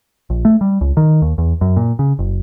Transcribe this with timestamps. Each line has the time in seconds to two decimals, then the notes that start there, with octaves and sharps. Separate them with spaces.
0.30 A#1
0.45 A3
0.61 G3
0.81 C#2
0.97 D#3
1.22 D#2
1.38 E2
1.61 F#2
1.77 A#2
1.99 C#3
2.19 F#1